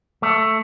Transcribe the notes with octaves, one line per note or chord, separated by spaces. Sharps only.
A3